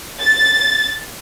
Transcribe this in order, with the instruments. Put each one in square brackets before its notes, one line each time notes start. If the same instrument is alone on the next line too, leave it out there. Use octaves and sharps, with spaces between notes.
[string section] A6